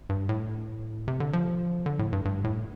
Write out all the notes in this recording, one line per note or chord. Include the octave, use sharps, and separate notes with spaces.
G2
A2
C3
D3
F3
D3
A2
G2
G2
A2